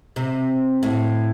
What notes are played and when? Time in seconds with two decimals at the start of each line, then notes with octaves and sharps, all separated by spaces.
0.16 C3
0.83 A2